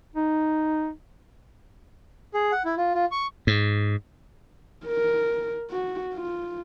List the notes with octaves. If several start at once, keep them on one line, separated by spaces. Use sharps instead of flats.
D#4
G#4
F#5
E4
F4
F4
C#6
G#2
A#4
F#4
F4